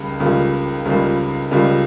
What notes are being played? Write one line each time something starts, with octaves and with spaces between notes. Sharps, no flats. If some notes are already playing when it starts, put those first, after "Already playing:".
Already playing: C#2 C#3 G3 A#3
C#2 C#3 G3 A#3 F4
C#2 C#3 G3 A#3 F4
C#2 C#3 G3 A#3 F4